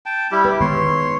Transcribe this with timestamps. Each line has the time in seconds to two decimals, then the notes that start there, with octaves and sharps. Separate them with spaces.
0.06 G5 A5
0.32 G3 E4 G4
0.45 B4
0.61 D#3 G#3 B3 C#5 C6